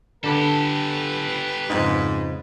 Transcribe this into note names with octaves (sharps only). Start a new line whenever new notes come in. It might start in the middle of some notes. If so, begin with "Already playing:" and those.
D3 D4 G4 A4 B4
F2 G#2 C#3 D#4